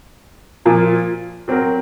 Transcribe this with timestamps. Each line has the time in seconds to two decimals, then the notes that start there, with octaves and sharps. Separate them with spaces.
0.65 A#2 F3 A#3 F4
1.48 F#3 C4 F#4 A#4